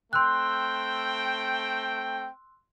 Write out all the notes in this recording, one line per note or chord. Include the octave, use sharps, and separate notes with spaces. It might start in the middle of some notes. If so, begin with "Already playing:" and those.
A3 C4 G5 C6 E6 F#6